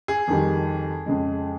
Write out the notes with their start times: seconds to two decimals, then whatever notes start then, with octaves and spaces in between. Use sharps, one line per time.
0.08 G#4
0.28 F2 D#3 G3
1.06 F2 C#3 G#3